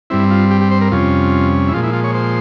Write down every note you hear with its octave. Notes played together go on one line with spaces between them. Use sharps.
G2 G3 C4 E4
F4
G4
G4
C5
A#4
F2 C3 G3 C#4 F4
E4
A#2 F3 G#3 F4
E4
F4
C#5
C5